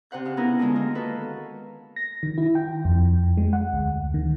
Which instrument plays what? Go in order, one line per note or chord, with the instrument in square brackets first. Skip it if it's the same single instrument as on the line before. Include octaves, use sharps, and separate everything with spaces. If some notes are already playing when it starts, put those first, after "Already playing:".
[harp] C3 C5 F#5 G6
C#3 F5
B3 C#4 D#4 E4 G#4 A#4
D3 D#3 G#3 F4
A#3 D#5
F#4 A4 B4 F5
[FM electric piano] A#6
D#3
E4
G5
F2
G#3
F#5
D2
D#3